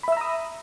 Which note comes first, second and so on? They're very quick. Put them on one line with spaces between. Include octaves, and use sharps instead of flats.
B5 E5 E6 A#5 D#6